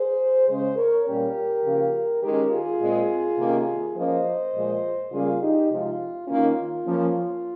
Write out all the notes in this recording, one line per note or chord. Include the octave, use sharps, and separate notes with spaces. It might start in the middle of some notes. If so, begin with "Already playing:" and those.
Already playing: G#4 C5
C#3 G#3 C#4 G#4 C5
A#4 C#5
A#2 G3 A#3 C#4 G4 A#4
C#3 F3 A#3
D#3 G#3 C#4 G4 A#4
F4 G#4
A#2 G#3 C4
C3 D#3 A#3 C#4
F3 A#3 C#4 C5 D#5
A#2 F3 G#3
C#3 G3 A#3 C#4 F4 G#4
D#4 G4
C3 F3 G#3 C4 F4
D#3 A#3 C#4 F4
F3 A#3 C#4